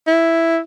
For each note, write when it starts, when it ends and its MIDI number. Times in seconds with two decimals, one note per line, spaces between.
0.07 0.60 64